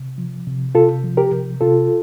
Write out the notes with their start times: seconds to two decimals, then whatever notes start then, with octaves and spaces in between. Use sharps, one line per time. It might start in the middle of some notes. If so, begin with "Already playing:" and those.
Already playing: C3
0.18 F3
0.47 C3
0.75 C3 F4 A4
1.04 F3
1.17 G4 A#4
1.32 C3
1.61 C3 F4 A4